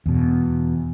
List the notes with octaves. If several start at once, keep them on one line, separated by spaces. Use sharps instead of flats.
E2 B2